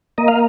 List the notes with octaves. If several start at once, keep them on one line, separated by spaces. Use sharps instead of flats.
A#3 D#5
F5